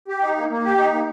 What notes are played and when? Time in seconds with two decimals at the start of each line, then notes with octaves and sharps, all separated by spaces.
0.08 G4
0.22 D#4
0.36 A#3
0.50 A#3
0.64 G4
0.78 D#4
0.92 A#3